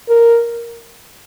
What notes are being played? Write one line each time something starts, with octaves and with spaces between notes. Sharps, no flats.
A#4